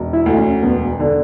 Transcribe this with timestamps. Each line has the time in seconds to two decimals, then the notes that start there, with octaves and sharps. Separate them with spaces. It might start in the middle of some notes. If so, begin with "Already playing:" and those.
Already playing: E1
0.13 E4
0.26 D2
0.38 C#4
0.63 E1 B3
1.00 D3